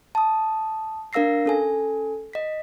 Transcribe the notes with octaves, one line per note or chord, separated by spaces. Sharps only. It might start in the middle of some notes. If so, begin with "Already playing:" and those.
A5 D#6
D4 A#4 F5 E6 A#6 C7
C#4 A4 G#5
D#5 B6